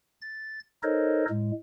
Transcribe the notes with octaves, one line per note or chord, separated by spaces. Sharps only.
A6
D#4 A4 A#4 C5 C#5 D#5
A2 G#3